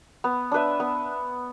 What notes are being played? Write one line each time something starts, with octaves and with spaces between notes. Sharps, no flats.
B3
D4 B4 E5
B3